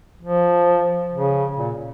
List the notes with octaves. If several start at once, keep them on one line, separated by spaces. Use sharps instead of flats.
F3
C#3
A#2